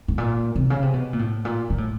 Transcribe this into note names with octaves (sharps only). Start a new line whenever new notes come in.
A2
A#2
C3
C#3
C3
B2
A#2
A2
A#2
A#2
A2